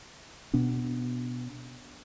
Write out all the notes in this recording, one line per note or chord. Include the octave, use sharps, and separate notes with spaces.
B2 B3 D4